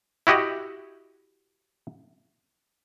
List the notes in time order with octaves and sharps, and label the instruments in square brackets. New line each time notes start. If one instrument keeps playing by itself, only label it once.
[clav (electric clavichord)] E4 F#4 G4 D#5 F#5